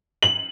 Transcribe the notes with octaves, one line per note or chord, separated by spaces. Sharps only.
F#7